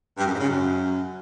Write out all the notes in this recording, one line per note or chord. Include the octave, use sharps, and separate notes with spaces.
G2
F#2
G#2
C#3
F#2